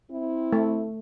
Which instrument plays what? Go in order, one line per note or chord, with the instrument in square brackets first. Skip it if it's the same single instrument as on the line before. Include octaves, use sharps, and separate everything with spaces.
[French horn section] C4 E4
[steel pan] A3